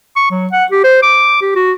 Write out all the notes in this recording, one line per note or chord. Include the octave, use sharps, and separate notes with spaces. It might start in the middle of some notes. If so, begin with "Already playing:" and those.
C#6
F#3
F#5
G4
C5
D6
G4
F#4